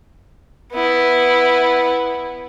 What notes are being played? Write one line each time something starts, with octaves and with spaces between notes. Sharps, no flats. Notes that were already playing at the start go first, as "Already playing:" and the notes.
B3 E4